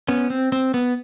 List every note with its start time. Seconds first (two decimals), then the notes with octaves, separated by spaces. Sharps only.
0.08 B3 C#4
0.30 C4
0.52 C4
0.74 B3